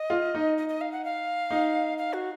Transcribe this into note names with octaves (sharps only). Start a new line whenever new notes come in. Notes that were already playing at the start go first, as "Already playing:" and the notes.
Already playing: D#5
F4
D#4
D#5
D#5
F5
F#5
F5
D#4
F5
F#4